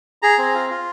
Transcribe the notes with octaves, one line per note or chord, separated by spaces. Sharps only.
G#4 A#5
C4
F4
F4